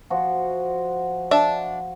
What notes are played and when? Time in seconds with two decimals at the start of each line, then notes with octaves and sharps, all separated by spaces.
0.10 F3 F#4
1.31 D4 E5 A5